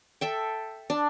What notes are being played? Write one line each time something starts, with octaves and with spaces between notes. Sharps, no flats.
A4 E5 G5
D4